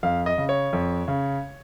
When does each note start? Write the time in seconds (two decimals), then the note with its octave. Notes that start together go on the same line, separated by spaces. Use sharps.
0.03 F2 F5
0.26 D#5
0.38 C#3
0.49 C#5
0.73 F2
1.08 C#3